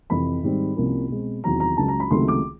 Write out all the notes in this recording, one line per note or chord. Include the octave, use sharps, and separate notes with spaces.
F2 C3 E3 B5
G#2 D#3 G3 C4
C2 C3 F3 A#3 C#4
B2 G#3 C4
E2 C3 D#3 F#3 A#5
A#5
C#2 C#3 F#3 A5
A#5
B5
C#2 C3 D#3 F#3 A3 C6
D6